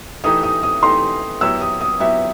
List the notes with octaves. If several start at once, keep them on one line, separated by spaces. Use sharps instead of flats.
E3 A3 D#4 G4 D#6
D#6
D#6
E3 A3 D#4 G4 C6
F#3 B3 E4 G4 E6
D#6
D#6
F#3 B3 E4 G4 E5